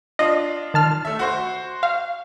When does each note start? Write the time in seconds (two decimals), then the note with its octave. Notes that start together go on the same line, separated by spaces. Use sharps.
0.19 D4 F4 D#5
0.74 D#3 A5 F6
1.05 A3 E5
1.19 F#4 C5 C#6
1.83 F5